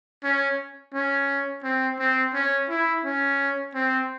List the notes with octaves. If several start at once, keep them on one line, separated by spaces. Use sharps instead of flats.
C#4
C#4
C4
C4
C#4
E4
C#4
C4